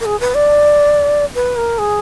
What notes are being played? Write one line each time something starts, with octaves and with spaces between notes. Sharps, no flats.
A#4
G#4
B4
D5
B4
A#4
G#4